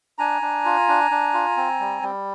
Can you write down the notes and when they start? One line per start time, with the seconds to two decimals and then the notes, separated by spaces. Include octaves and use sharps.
0.18 D4 G#5 A#5
0.42 D4
0.65 F4
0.88 D4
1.11 D4
1.34 F4
1.57 C4
1.80 G3
2.02 G3